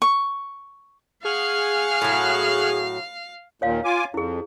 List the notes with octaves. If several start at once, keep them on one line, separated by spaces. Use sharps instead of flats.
C#6
G#4 F5 F#5 C#6 F6
A2 F#3
D#2 A#2 C#5 F5
F4 G#5 D6
F2 E4 G#4